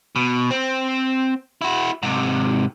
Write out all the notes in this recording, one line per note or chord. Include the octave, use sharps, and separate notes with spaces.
B2
C4
E4 F#4
G#2 C3